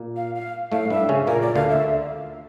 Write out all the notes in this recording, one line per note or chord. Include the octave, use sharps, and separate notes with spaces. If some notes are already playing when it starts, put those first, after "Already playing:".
Already playing: A#2 A#3
F5
F5
A2 A3 F5
G2 G3 E5
C#3 C#4
A#2 A#3 A#4
D5
D2 D3 F5
E5